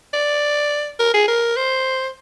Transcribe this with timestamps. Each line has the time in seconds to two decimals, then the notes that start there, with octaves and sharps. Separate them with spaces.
0.13 D5
0.99 A#4
1.14 G#4
1.28 A#4
1.57 C5